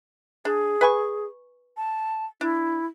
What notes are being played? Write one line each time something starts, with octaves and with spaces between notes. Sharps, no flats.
D4 G#4
B4 G#5 C#6
A5
D4 E4